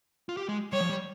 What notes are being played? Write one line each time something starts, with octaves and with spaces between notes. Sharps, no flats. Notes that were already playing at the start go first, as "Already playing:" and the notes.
F4
G4
G#3
G3 C#5
F3
G3